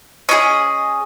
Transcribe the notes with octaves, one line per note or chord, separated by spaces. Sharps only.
C#4 F4 G#4 D#5